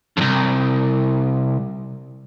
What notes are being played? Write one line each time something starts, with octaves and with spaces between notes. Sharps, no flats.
C2 F2